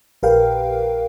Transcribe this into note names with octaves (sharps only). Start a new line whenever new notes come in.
A#1 G4 A#4 B4 F5 G5